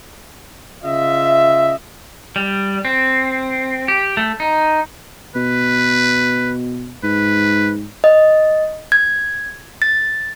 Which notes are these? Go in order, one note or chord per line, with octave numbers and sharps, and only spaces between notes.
C#3 F4 D#5 E5
G3
C4
G4
A3
D#4
B2 B4
G#2 B4
D#5
G#6
A6